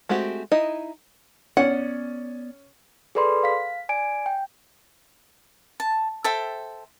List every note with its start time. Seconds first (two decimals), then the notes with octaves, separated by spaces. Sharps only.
0.09 G#3 A3 C4 F#4 G4
0.52 D#4 E4 D#5
1.57 B3 C#4 D5 F#5
3.15 G#4 A4 B4 D5 B5 C6
3.43 F5 B6
3.89 D5 G#5 D7
4.26 G5
5.80 A5
6.24 A4 C5 E5 G5